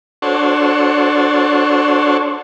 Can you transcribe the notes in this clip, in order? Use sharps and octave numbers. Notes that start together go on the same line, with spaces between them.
D4 F#4 A4 C5 C#5